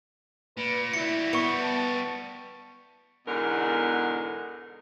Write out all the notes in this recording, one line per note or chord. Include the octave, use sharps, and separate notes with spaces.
A#2 B4
G3 E4 F#4 C#7
B3 C#6 C#7
A5
E2 G#2 B2 D3 A#4 F#5